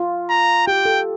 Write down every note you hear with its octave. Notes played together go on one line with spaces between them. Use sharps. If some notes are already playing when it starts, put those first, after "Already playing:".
Already playing: F4
A#5
G4 G5
A4